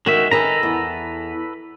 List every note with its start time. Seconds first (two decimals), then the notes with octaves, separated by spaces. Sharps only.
0.06 D#3 G#3 F#4 E5
0.31 D#3 G#4 A4 B4 A#5
0.63 E2